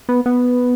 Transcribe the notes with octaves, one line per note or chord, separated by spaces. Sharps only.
B3
B3